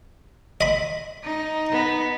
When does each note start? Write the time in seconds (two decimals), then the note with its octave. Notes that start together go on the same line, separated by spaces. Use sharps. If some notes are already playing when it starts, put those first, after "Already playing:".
0.61 D#5 B5
1.24 D#4
1.71 B3